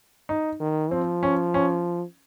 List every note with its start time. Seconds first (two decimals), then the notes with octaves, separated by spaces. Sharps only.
0.29 D#4
0.60 D#3
0.91 F3 C4
1.23 C#4
1.54 C#4